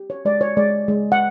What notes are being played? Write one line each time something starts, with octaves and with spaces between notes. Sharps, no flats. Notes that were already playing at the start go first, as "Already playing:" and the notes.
Already playing: G4
C#5
G#3 D5
C#5
G#3 D5
G#3
F#5